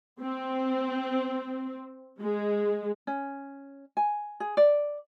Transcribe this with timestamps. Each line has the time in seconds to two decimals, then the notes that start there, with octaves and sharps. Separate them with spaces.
0.20 C4
2.20 G#3
3.07 C#4
3.97 G#5
4.40 G#4
4.57 D5